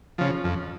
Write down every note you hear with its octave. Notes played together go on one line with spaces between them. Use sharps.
C#3 F3
F2